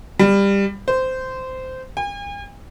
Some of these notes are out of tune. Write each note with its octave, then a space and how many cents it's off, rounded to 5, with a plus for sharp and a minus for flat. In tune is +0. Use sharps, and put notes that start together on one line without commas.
G3 +20
C5 -15
G#5 -45